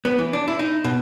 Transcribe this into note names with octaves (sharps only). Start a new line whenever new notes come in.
B3
E3
D4
E4
D#4
B2